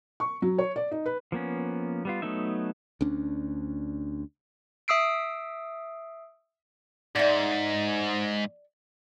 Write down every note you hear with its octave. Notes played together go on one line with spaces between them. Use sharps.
C#6
F#3
C#5
D5
D#4
B4
F3 A#3 B3 C#4
G3 B3 F4
F#3 A3 B3 D#4 E5
D2 C#4 D4
E5 D#6 E6 C7 D7
G#2 D5 E5